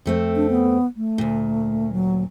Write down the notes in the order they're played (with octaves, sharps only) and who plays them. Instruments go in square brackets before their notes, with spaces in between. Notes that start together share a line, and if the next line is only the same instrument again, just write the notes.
[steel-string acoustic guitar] F2 A3 C4
[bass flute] D4
B3
A3
[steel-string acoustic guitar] D2 A#2
[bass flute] F#3